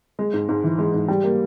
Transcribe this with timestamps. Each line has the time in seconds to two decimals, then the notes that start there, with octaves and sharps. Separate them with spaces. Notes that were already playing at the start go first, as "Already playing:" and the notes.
0.19 G#3
0.34 G#2
0.49 G#2
0.64 E3
0.79 G#3
0.94 G#2
1.08 G3
1.24 A#3